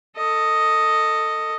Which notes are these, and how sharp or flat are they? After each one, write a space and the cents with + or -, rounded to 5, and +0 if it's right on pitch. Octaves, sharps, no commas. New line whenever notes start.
A4 +20 D#5 +0